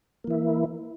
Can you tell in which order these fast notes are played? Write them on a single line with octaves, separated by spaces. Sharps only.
A#3 E3 E4